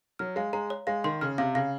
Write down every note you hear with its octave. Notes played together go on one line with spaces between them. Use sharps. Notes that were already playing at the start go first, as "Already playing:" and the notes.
F#3 F6
G#3 F5
G#3 A#5
C#5
G#3 F5
D#3 C6
C#3 F6
C3 F5
C#3 F5